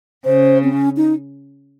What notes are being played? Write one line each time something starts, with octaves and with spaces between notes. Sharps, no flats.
C#3 C5
C4
C#4
D#4